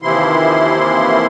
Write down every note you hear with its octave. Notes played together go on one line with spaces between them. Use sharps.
D#2 C3 E3 F3 E4 C6